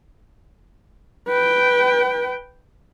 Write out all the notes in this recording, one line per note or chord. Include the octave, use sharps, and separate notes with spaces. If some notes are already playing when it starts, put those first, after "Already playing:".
B4 G5